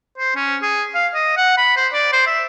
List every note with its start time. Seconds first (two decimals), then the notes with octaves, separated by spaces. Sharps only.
0.18 C5
0.36 C#4
0.62 G#4
0.95 F5
1.15 D#5
1.37 F#5
1.58 B5
1.77 C5
1.93 D5
2.13 C5
2.27 E5